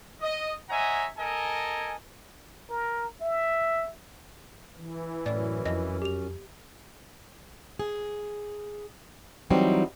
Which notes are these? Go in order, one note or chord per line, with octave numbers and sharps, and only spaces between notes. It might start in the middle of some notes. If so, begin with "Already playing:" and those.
D#5
C#5 D#5 E5 F#5 G#5 A#5
A4 A#4 D#5 G#5
A#4
E5
E3
F#2 A2 C#4 D5
F2 D#5
G4 F7
G#4
E3 F#3 G3 C4 D#4